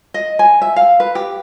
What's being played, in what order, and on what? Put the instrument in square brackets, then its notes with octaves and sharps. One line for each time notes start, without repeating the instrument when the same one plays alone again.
[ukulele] D#5
G#5
E5
F5
B4
G4